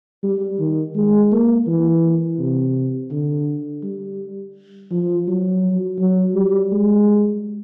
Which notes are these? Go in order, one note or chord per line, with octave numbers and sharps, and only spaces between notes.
G3
D#3
G#3
A#3
E3
C3
D3
G3
F3
F#3
F#3
G3
G#3